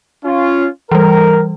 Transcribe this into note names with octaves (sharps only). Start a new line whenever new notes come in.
C#4 F4
E3 G3 A#4